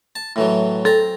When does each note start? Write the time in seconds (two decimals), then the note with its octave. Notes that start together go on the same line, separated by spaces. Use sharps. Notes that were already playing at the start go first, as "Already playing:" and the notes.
0.16 A5
0.36 A2 E3 F#3
0.85 C4 A4 A#5